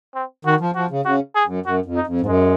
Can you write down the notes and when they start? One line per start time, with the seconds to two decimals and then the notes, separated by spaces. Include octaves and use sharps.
0.15 C4
0.45 D#3 F#4
0.60 F3
0.75 F3 F#4
0.91 C#3
1.05 C#3 F#4
1.35 G#4
1.46 F#2
1.66 F#2 F#4
1.86 F2
1.96 D#4
2.07 F2
2.21 G#2
2.26 F#2 G#3